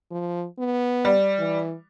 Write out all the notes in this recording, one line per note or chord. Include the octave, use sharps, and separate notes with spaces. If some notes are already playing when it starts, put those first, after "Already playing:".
F3
B3
G3
E3